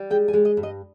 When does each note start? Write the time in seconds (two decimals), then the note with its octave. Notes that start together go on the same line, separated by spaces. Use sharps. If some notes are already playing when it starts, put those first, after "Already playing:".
Already playing: G3
0.10 G#3 G5
0.28 G#5
0.33 G#3
0.45 D#5
0.57 G2
0.63 D#5